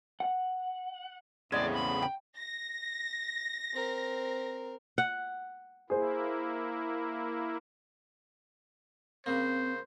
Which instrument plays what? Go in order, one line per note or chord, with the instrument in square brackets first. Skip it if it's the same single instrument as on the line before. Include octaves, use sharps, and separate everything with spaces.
[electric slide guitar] F#5
[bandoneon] E2 A2 B3 [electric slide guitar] C#3 C4 [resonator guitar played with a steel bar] G#3 [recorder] D5
[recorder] B5
[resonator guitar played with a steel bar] G5
[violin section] A#6
[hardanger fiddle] C4 A#4
[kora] F#5
[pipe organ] A#3 E4 [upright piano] G#4 C5
[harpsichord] C#3 A#3 [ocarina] C4 [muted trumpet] C5